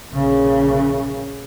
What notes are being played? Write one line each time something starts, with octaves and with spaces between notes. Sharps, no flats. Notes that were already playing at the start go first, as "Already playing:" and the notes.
A#1 C#3